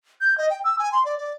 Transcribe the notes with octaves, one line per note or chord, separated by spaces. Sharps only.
G6
D#5
G5
E6
G#5
C6
D5
D5